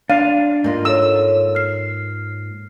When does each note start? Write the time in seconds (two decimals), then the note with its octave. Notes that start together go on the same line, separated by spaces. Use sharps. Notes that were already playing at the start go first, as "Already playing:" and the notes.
0.10 D4 F5 D#7
0.64 G#2 A#3 F4
0.85 A4 C#5 E6
1.55 F6 C7